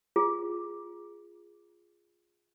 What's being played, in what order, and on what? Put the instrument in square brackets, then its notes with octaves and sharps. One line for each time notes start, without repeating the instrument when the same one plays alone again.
[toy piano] F4 G#4